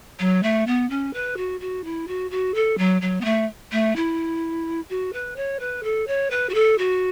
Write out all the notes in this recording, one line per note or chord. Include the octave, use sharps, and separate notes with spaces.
F#3
A3
B3
C#4
B4
F#4
F#4
E4
F#4
F#4
A4
F#3
F#3
B3
A3
A3
E4
F#4
B4
C#5
B4
A4
C#5
B4
F#4
A4
F#4